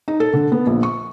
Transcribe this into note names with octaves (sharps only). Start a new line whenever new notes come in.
D#4
A4
D3
B3
A#1
C#6